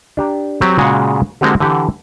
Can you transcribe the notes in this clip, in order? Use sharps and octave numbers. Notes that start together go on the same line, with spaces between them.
D4 G4 A#5
F#3 C4 G4
A#2 C#3 G#3 F#4 G#4 F#5
D3 G#3 A#3 C4 F#4 G4
D3 E3 G4 F#5